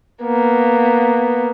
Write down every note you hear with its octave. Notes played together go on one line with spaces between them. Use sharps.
A#3 B3